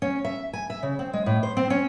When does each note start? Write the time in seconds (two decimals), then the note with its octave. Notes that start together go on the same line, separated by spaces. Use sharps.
0.02 C#4
0.25 E5
0.53 G#5
0.70 E5
0.83 C#3
0.99 C4
1.13 G#3
1.26 A2
1.43 C5
1.57 C4
1.70 C#4